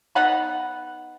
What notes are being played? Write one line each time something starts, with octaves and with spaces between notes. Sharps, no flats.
B3 D#4 F#5 B5